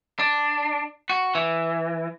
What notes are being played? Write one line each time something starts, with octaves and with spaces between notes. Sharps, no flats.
D4
F#4
E3